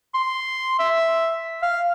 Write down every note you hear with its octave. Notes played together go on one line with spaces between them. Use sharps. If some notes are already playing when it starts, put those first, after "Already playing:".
C6
E5
F5